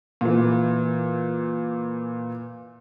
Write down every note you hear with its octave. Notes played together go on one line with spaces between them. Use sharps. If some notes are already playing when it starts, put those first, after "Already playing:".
A#2 E3